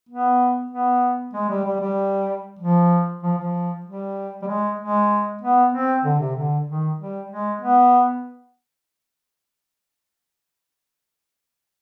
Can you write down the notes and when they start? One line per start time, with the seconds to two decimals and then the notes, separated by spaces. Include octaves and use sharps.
0.09 B3
0.71 B3
1.34 G#3
1.49 G3
1.65 G3
1.81 G3
2.59 F3
3.23 F3
3.38 F3
3.85 G3
4.42 G3
4.47 G#3
4.79 G#3
5.41 B3
5.73 C4
6.04 D3
6.20 C3
6.36 D3
6.67 D#3
6.99 G3
7.30 G#3
7.61 B3